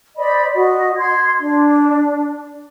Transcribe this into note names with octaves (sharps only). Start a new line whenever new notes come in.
C5 D5 D#5 B5
F#4 D#5
C6 G#6
D4